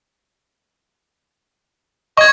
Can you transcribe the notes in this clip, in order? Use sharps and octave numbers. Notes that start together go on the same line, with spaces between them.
D#5 C#6 G#6